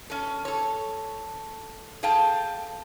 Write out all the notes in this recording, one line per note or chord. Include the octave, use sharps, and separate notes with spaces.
C#4 A4
A4 C#5
G#4 A4 F5 G5 A5